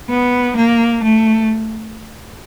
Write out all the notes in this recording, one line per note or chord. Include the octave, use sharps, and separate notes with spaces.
B3
A#3
A3